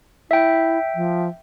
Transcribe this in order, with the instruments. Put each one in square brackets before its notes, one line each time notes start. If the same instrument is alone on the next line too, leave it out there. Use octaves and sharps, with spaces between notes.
[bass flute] E4 [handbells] E5 G5
[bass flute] F3